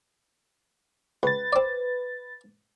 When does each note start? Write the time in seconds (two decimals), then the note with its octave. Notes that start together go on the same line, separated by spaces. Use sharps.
1.23 C#2 B4 A6
1.53 C4 D5